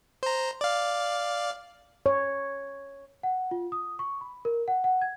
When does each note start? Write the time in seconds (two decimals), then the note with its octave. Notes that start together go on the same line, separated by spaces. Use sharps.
0.23 C5 A#5
0.61 D5 F5
2.06 C#5
3.23 F#5
3.51 F4
3.72 D#6
3.99 C#6
4.21 B5
4.45 A#4
4.68 F#5
4.84 F#5
5.02 G#6